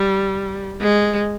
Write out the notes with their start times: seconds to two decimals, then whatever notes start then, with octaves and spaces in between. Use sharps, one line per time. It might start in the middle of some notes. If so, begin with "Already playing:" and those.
Already playing: G3
0.81 G#3